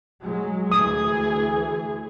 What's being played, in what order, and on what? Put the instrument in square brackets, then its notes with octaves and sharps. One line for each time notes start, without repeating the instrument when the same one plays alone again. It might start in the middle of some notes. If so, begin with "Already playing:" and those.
[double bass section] F#3 G#3
[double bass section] D2 E3 [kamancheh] G#4 [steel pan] D#6